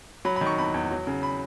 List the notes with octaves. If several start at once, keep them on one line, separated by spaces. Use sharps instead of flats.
F#3 B5
D#3 B5
C#6
E2 B5
E2
F#3
C#3
B5